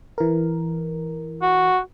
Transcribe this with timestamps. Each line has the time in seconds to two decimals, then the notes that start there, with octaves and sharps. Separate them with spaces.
0.18 E3 A#4
1.42 F#4